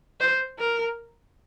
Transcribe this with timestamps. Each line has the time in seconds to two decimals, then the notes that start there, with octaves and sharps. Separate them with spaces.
0.20 C5
0.59 A#4